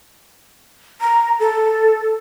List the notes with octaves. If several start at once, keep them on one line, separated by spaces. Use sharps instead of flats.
A#5
A4